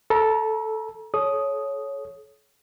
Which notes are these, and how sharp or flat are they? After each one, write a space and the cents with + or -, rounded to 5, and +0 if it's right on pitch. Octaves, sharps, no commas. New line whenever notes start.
A4 -5 A#5 +35
A4 -40 C#5 +0 D#6 +0